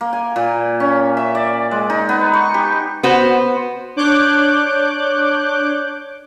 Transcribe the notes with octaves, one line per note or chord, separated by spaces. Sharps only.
A#3
G#5
A#2
C#4
E5
D5
G#3
D#4
B3
C#6
G4
B3 F#4 C5
D4 C#5 D6 F#6 G6